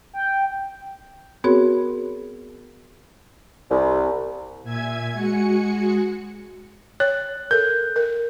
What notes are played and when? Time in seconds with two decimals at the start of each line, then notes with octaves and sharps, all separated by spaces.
0.13 G5
1.44 B3 C4 F#4 G#4 A#4 C#5
3.70 C2
4.63 A#2 E5 G#5 G#6
5.13 G#3 F#4 G#5 C#7
7.00 C#5 F#6
7.51 A4 A#4 G6
7.96 A#4